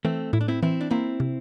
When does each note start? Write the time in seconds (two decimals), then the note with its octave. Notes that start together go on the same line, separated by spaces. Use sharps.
0.05 E3 A3 C4
0.33 A2 E4
0.41 D4
0.48 C4 E4
0.63 E3 C4 E4
0.81 D4
0.91 A#3 C4 E4
1.20 C3